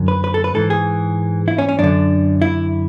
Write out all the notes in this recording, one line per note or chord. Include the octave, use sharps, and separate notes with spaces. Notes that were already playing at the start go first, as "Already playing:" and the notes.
Already playing: F#2 D3
B4
B4
A4
B4
G#2 E3 A4
G#4
E4
C#4
C#4
F#2 D3 D4
E4